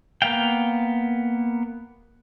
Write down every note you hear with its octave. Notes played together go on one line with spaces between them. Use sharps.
A#3 B3 F5 G5